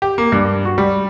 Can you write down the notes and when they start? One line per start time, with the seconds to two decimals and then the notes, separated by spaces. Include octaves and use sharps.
0.02 G4
0.18 A#3
0.32 G2
0.65 F#4
0.78 G3